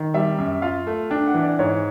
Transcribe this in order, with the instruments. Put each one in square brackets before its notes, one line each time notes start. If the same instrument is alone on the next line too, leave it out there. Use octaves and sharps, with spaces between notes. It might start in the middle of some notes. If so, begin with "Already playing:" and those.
Already playing: [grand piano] D#3
[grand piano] G3 [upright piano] E5
[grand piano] F#2
[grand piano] F4 [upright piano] F5
[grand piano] A3
[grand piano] D4 [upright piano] G5
[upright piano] F#5
[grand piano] E3
[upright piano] D5
[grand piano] G#2 [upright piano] C#5